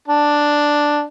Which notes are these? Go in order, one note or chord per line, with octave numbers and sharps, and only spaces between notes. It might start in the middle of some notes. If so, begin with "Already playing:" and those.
D4